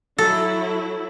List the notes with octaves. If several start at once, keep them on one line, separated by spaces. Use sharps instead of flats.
F#3 E4 A4